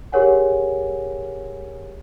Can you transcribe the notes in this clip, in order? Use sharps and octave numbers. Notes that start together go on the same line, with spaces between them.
G4 G#4 A#4 C#5 F#5 G#5